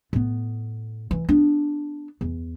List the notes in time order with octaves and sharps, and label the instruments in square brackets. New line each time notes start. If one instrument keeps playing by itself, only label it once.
[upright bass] A2 B3
E3
B3 D4
E2